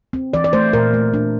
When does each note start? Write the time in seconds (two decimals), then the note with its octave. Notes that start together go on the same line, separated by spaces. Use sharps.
0.13 C4
0.34 E3 D5
0.44 D5
0.53 A3 C5
0.73 A#2 A#4
0.94 A3
1.14 D4